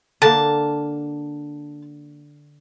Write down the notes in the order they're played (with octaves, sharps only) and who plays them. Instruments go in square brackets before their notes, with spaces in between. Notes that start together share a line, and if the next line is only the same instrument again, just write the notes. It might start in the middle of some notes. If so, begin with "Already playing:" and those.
[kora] D3 A#3 [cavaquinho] A5